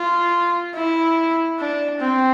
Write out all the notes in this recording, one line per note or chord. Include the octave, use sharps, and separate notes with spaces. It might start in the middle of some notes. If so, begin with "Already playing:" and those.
Already playing: F4
E4
D4
C4